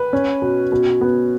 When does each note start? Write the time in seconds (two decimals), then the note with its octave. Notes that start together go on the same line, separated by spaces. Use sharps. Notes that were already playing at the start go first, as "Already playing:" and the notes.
Already playing: B4
0.13 C#4
0.42 B2
0.72 B2
1.01 B3